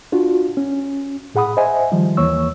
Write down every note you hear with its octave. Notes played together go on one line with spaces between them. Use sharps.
D4 F4 F#4
C#4
A2 G#4 F#5 B5 D#6
C5 D#5 E5 G#5
D#3 F3 G3
D#2 E3 A#3 C#5 C#6 E6